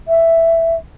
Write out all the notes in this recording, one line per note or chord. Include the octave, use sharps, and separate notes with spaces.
E5